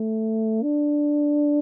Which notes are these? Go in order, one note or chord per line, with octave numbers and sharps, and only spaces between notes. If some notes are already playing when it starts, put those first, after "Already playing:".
Already playing: A3
D4